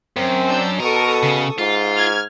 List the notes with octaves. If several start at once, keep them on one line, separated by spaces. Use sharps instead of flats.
F#2 C4
D4 E6 G6
B2 A4 A#4 C#6 D#6
C#3
G#2 F4
F6 G#6